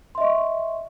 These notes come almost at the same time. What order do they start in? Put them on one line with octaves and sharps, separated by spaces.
C6 E5 D#5 C#6